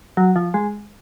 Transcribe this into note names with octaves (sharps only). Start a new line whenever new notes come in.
F#3
F3
G#3